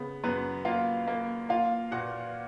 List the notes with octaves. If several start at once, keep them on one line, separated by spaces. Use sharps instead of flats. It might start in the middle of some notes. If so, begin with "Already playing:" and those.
Already playing: C#3 B3
F#2 B3 B4
A#3 F4 F5
A#3
A#3 F4 F5
A#2 F#4 F#5